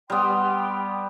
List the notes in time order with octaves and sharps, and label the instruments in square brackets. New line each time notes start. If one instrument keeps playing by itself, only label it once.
[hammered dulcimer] G3 B3 [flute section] G5 C6